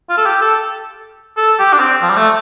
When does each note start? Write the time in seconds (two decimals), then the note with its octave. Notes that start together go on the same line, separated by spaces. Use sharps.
0.10 F4
0.18 A4
0.26 G4
0.42 A4
1.37 A4
1.59 G4
1.73 D4
1.79 C4
2.02 F3
2.10 G3
2.17 A3